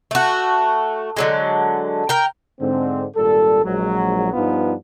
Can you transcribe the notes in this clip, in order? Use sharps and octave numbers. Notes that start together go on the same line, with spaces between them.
A3 F#4
D3 F#3 G#3
A#4 G5
G#2 D3 C4
G#1 A#2 G3 A4
A#1 F#3 G#3
G2 F3 B3 D4 D#4 F4